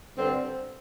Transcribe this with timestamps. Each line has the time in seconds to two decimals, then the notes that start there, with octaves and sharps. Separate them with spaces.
0.17 G2 D3 G3 C4